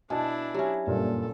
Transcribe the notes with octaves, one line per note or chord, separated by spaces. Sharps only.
B2 D4 E4 G#5 A5
F#3 C#4 G4 E5
F#1 G2 A#2 A4